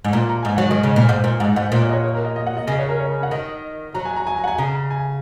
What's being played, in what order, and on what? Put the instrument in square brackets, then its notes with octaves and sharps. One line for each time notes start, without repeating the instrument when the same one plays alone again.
[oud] G#2
[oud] A#2 [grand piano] A#5
[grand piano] A#5
[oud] G#2 [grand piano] G#5
[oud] F#3 [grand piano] F#5
[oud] D#3 [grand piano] G#5
[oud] C#3
[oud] A#2 [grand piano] G#5
[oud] G#2 [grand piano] F#5
[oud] A#2
[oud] G#2 [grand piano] F#5
[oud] G#2 [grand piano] F#5
[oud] A#2 [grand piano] D#5
[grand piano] C#5
D#5
C#5
C#5
A#4
D#5
D#5
F#5
D#5
[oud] C#3 [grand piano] D#5
[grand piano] C#5
A#4
C#5
F#5
[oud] D#3 [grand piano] D#5
[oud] F#3 [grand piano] A#5
[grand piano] G#5
A#5
G#5
A#5
F#5
G#5
[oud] C#3 [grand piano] A#5
[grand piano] G#5